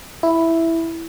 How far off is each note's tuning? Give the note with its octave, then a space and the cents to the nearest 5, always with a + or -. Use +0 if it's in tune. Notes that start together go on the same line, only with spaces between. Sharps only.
E4 +0